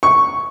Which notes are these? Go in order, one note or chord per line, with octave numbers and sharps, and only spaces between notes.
C#6